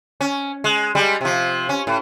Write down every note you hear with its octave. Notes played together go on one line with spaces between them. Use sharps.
C#4
G#3
G3 G#3
C3 F3
C#4
A2